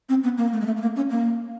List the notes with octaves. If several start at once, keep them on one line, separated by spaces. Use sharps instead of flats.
C4
B3
A#3
A3
G#3
A3
A3
A#3
C#4
A#3